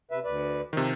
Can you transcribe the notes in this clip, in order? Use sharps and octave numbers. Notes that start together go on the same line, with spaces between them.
C3 B4 E5
D2 B4 D5
C3 D#3 F3